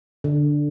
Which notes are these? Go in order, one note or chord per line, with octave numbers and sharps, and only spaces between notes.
D3